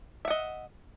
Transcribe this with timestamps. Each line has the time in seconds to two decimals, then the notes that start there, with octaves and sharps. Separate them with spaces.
0.25 E5
0.28 F#5
0.30 D#5